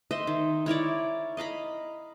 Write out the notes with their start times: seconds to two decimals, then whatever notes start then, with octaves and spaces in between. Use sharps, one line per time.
0.11 C5 D#5 E5
0.27 D#3
0.66 E4 A#4 C#5 D5
1.37 D#5 F5 A#5 B5